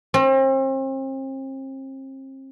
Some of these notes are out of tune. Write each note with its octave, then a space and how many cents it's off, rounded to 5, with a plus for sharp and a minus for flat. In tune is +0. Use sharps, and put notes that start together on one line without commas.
C4 +40